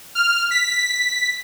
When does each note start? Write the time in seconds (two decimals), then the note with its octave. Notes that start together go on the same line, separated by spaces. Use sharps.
0.15 F6
0.51 B6